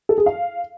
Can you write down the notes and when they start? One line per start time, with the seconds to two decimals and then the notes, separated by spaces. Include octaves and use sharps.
0.09 A4
0.18 G#4
0.26 F5